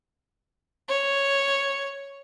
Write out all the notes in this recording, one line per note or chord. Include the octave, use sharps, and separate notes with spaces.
C#5